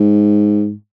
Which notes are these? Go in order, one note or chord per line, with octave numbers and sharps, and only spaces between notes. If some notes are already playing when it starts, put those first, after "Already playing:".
Already playing: G#2